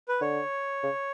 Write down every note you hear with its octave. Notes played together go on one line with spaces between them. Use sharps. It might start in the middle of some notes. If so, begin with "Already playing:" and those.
B4
D3 C#5
C#3